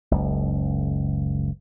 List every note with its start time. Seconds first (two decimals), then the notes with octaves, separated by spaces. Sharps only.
0.11 F#1 C#2